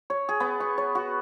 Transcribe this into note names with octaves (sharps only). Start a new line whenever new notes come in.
C#5
G#4
B3
C#6
C#5
F#4